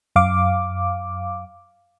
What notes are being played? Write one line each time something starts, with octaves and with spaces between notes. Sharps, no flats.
F#2 F5 D6